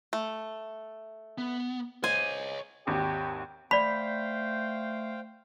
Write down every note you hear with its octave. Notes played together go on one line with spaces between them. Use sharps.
A3
B3
C5 C#5 D#5 G#5
G#1 D#2 G4
A3 C5 D5 F5 G5 B5 B6